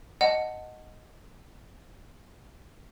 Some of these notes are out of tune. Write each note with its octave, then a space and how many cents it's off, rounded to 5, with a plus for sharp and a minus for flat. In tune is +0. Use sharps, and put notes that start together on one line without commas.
D#5 +0 F#5 +0 A5 +0